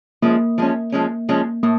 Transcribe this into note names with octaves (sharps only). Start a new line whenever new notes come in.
F3 G#3 A#3 C#4
F3 G#3 C#4
F3 G#3 C#4
F3 G#3 C#4
A2 A#3